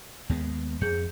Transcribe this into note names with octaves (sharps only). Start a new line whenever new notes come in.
D#2 G#3 B3
F2 G#4 G6 C#7